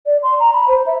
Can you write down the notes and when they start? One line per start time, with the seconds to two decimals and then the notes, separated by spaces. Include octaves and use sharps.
0.06 D5
0.23 C6
0.40 A#5
0.53 B5
0.68 C5
0.86 E5